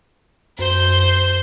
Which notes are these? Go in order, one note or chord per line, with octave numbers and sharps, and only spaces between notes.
F#2 C5 G6